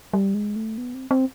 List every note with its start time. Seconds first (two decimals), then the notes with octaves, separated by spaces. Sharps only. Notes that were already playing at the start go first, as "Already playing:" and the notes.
0.13 G3
0.34 G#3
0.56 A3
0.78 B3
0.94 C4
1.11 C4